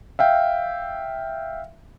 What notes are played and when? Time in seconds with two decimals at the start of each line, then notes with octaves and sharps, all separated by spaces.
0.19 E5 F5 G5